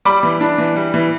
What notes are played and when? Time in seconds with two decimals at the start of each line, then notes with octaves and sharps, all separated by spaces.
0.05 G3 B5 D6
0.23 E3
0.41 D4
0.58 E3
0.76 G3
0.94 E3